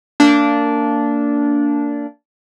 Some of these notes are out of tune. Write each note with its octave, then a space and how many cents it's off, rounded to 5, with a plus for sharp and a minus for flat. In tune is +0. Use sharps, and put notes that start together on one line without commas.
A#3 -25 D4 -15